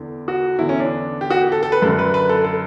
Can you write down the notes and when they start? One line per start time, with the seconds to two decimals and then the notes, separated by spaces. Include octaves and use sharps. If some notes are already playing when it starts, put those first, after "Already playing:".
Already playing: E2 D3
0.28 F#4
0.58 E2 D3 E4
0.69 C#4
0.80 D4
1.21 G4
1.30 F#4
1.41 G4
1.52 A4
1.63 A4
1.72 B4
1.82 F#2 D3 A4
1.99 B4
2.14 B4
2.29 A4
2.45 A4